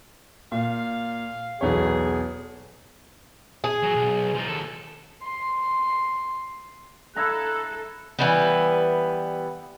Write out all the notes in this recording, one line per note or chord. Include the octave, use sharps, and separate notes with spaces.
A#2 F5
B1 E2 G#4 C#5
G#4
F#3
B1
F3 D#4
D#2 A4
C6
E4 A4 E5 A#5 F#6
E3 G3 B3